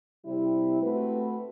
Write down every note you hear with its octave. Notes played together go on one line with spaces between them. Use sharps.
C3 G3 C4 E4
A3 C4 F#4 B4